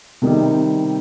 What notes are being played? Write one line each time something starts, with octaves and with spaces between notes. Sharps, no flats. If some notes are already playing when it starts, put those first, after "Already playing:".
C3 D#3 G3 D#4 G4